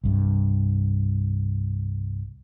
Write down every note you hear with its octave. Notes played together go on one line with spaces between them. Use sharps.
C2 G2